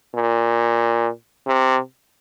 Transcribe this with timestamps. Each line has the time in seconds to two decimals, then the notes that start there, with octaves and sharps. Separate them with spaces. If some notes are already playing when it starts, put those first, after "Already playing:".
0.15 A#2
1.47 C3